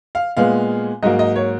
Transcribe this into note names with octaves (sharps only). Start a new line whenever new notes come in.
F5
A#2 G#3 B3 F5
G#2 F#3 A#3 D#5
D#5
C#5